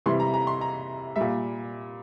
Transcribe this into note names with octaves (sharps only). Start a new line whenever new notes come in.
C3 E3 G3 C6
A#5
A#5
C6
A#5
A#2 G3 E5